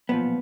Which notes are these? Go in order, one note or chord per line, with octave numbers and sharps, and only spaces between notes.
B1 A#2 F3 B3